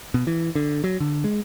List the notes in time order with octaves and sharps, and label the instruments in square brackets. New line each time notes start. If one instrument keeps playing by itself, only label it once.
[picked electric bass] B2
E3
D3
F#3
D3
G#3